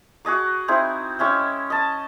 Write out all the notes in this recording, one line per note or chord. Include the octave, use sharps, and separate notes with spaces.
F#4 G#4 D#5 D6
C4 D#4 E4 G#4
G#3 C#4 E4 G5
D#5 A5